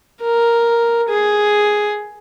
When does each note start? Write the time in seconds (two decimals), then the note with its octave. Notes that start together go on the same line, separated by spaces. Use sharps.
0.22 A#4
1.09 G#4